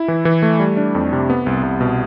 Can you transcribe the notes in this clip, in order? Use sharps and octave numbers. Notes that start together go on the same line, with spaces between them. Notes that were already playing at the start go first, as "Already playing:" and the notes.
Already playing: E4
E3
E3
A3
G3
D4
F2
C3
B3
C2
C2
B2